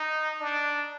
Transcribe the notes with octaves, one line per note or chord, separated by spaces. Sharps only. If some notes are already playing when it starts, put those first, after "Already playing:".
Already playing: D#4
D4